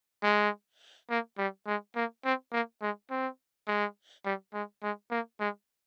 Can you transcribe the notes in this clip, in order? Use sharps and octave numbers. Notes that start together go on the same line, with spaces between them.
G#3
A#3
G3
G#3
A#3
C4
A#3
G#3
C4
G#3
G3
G#3
G#3
A#3
G#3